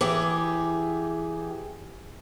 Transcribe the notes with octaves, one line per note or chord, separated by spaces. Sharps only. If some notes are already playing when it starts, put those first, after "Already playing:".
E3 G4 G#4